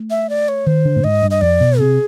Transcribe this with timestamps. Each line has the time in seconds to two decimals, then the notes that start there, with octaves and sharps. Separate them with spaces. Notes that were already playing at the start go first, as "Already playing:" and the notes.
Already playing: A3
0.10 E5
0.30 D5
0.48 C#5
0.67 D#3 C5
0.85 D3
0.96 A2
1.04 G#2 D#5
1.22 G2
1.31 D#5
1.41 F2 D5
1.60 B2
1.79 C3 G#4